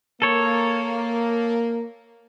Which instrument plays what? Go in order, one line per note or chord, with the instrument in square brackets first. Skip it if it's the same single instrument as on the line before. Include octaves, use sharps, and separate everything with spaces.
[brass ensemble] A#3 [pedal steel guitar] A4 C#5